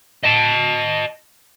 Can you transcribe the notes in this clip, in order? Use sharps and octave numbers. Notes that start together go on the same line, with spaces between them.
D#5 A5